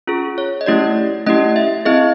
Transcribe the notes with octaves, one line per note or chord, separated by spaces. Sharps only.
C#4 F4 G#4
C#5
D#5
A3 C#4 E4 G4 D5
A3 C#4 E4 G4 D#5
E5
C4 E4 G#4 D#5